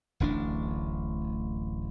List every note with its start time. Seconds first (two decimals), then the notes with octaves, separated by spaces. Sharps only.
0.20 D1 A1 D4